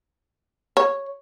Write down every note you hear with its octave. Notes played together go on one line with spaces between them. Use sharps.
C#5